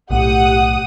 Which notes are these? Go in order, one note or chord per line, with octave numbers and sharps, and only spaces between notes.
B1 A2 G4 F#5 D#6